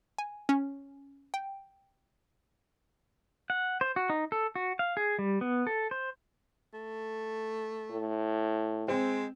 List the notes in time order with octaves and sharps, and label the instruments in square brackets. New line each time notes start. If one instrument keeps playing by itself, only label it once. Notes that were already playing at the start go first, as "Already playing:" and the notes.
[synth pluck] G#5
C#4
G5
[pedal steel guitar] F#5
C5
F#4
D#4
A4
F#4
F5
G#4
G3
B3
A4
C5
[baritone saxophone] A3
[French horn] A2
[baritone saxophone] G#3 [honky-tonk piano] C4